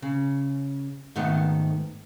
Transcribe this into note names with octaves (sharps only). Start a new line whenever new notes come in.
C#3
G#2 D#3 A3 B3